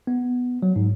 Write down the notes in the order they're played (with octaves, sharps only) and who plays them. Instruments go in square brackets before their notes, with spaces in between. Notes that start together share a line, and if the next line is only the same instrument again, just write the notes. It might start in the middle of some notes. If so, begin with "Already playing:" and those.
[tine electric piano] B3
F#3
G#2